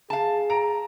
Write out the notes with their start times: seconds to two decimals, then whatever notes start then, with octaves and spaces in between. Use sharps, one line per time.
0.10 G#4 F5 A5
0.50 A#5 D7